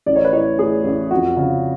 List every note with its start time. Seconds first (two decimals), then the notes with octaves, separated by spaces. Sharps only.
0.06 A1 D5
0.16 C#5
0.25 B4
0.33 A2 C#5
0.59 A2 G#4
0.84 A1
1.11 F2 F#4
1.37 C#3